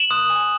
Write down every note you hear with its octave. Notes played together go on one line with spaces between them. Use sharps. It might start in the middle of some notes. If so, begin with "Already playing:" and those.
Already playing: E7 F#7
C6 D#6 F#6
G#5